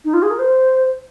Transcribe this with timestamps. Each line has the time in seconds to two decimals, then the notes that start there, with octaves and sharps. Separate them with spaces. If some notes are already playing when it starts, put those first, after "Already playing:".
0.04 D#4
0.13 F4
0.22 G#4
0.30 A#4
0.39 C5